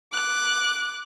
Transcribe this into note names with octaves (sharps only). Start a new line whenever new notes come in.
D6 F#6